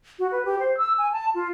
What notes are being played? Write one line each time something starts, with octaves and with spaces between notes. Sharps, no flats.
F#4
B4
G4
C5
E6
G#5
A5
F4